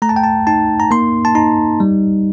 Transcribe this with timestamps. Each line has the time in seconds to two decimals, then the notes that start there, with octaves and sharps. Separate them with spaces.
0.02 A3 A#5
0.09 A5
0.16 G5
0.23 A5
0.47 D#4 A5
0.80 A#5
0.91 A#3 C6
1.25 A5
1.35 D#4 A#5
1.80 G3